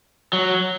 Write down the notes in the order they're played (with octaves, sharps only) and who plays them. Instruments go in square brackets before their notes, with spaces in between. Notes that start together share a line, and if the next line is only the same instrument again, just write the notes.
[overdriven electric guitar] F#3